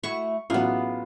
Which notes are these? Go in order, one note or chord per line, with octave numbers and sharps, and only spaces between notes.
A3 E4 F#4 C#6
A1 F#3 B3 F4 G#4